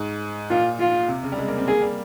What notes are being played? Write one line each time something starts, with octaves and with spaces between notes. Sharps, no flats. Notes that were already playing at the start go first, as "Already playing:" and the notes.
Already playing: G#2
A#2 F4
F4
C3
C#3
G3
G#3
A#3
C4
A#3 G#4
G3